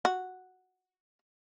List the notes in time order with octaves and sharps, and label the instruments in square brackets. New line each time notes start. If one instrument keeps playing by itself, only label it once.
[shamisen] F#4